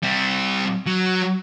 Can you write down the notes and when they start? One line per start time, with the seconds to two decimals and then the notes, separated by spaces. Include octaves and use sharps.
0.03 G3 C4
0.86 F#3